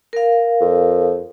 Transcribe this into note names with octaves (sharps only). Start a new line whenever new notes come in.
A#4 F5
F2